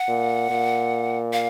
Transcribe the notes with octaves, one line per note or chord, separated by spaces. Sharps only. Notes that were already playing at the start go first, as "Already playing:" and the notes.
Already playing: F#5
A#2
A#2
F5